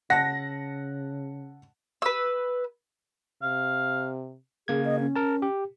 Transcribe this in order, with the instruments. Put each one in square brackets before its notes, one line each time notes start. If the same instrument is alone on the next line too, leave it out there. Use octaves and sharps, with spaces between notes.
[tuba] C#3 [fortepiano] F#5 A5 [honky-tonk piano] A#6
[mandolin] B4 E6
[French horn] C3 [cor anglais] F5
[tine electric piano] C#3 A#3 G#6 [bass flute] G#4
[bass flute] D#5
C#4
[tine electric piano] A#4 A5
G4